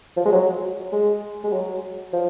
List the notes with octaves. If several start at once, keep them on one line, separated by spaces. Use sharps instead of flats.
F3
G#3
F#3
G#3
G#3
F#3
F3